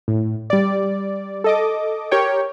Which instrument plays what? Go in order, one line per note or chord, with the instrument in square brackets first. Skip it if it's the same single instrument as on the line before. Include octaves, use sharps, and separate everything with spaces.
[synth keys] A2
G3 D5
A4 D#5 D6
G4 A#4 C#5 G5